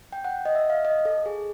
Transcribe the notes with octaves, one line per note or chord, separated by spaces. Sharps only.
G5
F#5
D#5
E5
F5
D#5
A4
G#4